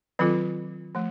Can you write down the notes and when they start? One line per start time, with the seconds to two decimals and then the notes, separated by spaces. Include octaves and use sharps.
0.19 D#3 F#3 C4 F4 A4
0.95 F3 A3